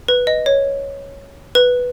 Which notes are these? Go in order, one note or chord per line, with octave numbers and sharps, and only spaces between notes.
B4
D#5
C#5
B4